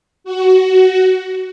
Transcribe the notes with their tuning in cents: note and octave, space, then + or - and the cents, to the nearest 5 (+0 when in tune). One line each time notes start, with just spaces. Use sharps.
F#4 +15